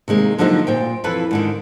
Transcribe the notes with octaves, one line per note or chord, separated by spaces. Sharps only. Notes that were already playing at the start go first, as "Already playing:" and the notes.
C3 D#3 G#3 A#3
D3 F3 F#3 A#3 D#4
A#2 C5 G5
F2 E3 F4 A4 B4
G#2 D3 D#3